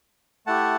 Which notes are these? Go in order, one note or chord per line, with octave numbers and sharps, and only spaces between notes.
A3 E4 G4 F#5 A5